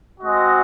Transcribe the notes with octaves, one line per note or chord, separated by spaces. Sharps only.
G#3 C4 F#4 D#5